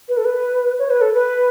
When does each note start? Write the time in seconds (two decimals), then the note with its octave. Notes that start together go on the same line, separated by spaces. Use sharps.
0.09 B4
0.17 A4
0.25 B4
0.79 C#5
0.90 B4
1.01 A4
1.14 B4